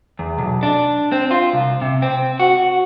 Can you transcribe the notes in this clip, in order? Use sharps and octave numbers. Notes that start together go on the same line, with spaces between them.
E2
B1
D4
C4
F4
C2
C3
C4
F#4